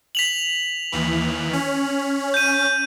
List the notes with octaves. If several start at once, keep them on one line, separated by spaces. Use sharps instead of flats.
B6 F7 F#7
D#2 E3
C#4
G6 D#7